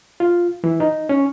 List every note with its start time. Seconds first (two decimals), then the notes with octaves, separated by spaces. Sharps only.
0.20 F4
0.64 E3
0.80 D#4
1.09 C#4